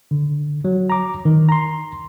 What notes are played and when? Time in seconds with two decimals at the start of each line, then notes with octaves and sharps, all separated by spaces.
0.11 D3
0.65 F#3
0.90 A#5 D6
1.25 D#3
1.49 A#5 C6